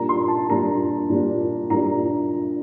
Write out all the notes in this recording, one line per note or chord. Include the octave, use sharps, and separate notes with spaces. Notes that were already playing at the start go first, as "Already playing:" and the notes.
Already playing: A#2 G3 A#3 D4 A#5
C6
A5
A#2 G3 A#3 D4 A#5
A#2 G3 A#3 D4
A#2 G3 A#3 D4 A#5